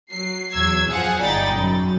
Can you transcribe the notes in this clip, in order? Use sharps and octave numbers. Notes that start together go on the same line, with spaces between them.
F#3 C7
E2 F#3 E6 G#6
F#2 F3 G#4 F5 F#5
G1 D#4 D5 G5 B5 A6
F#2